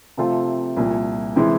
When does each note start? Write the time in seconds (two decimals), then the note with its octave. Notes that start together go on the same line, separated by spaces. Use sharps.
0.17 C3 F3 A3 C4 F4
0.77 C2 A#2 F3
1.36 C3 E3 G#3